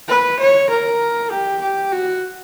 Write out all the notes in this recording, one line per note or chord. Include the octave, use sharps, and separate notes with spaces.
B4
C#5
A#4
G4
G4
F#4